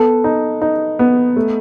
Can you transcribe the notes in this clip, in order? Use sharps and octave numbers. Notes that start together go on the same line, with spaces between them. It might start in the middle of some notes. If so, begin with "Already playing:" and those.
Already playing: B3 A4
D#4
D#4
B3
A3